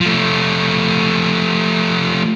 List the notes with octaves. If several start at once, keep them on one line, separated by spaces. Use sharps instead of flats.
F3 A3